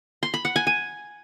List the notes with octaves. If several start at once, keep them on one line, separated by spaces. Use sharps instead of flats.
C6
B5
F#5
G#5
G#5